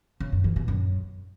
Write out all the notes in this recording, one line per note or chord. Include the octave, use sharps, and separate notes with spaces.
C#3
F#2
E3
B2
F#2